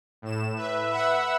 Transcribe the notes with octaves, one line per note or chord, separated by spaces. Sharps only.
A2 E7
B4 E5
E5 F#5 B5 E6